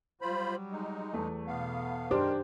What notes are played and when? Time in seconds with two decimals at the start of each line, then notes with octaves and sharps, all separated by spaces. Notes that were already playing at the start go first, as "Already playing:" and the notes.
0.21 F#3 G3 F4 C5 B5
0.72 G#3 D#4
1.13 E2 A3
1.47 B2 B3 F5
2.11 F#2 D#3 G#3 D4 G4 A#4 C5 D6